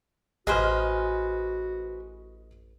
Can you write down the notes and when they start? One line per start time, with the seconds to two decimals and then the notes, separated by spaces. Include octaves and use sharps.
0.47 A1 F#4 G#4 B4 C5 D#5 F6